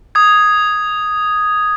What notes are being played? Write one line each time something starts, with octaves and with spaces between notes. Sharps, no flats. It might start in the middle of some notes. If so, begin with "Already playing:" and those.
D#6 G#6